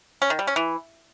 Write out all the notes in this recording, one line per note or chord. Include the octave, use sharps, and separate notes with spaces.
C#4
D#3
G3
C#4
E3